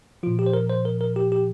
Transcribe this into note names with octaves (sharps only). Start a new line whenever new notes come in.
A#2 F3 F4
G4
C5
A#4
C5
A#4
A#4
G4
G4